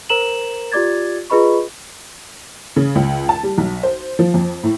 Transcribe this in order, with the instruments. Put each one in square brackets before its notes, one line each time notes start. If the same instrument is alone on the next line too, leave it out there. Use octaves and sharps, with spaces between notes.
[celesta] A#4 C5 A#5 E7 F#7
F4 G4 D5 D6 G#6 A6
F4 G#4 B4 D#5 B5 C#6
[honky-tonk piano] C#3
C#2
A5
G3
B1
C5
F3
F2
A2